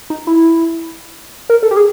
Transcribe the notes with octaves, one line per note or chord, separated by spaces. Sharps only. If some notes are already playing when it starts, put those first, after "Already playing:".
D#4
E4
A#4
A4
G4
G#4